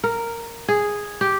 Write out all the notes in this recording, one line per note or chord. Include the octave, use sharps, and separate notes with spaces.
A#4
G#4
G4